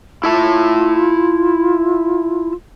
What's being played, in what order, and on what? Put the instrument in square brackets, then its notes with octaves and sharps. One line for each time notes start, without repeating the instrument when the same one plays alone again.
[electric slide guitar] E4 E5 A5 [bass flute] F4